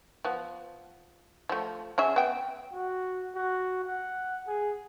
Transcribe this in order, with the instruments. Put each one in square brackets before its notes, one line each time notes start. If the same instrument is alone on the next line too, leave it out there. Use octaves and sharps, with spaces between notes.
[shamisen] F3 B3
F3 A3
C#4 G#4 E5
B3 G5
[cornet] F#4
F#4
F#5
G#4